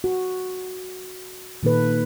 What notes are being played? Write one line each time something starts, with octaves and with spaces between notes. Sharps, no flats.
F#4
A#2 D#3 A#3 D#4 A4 B4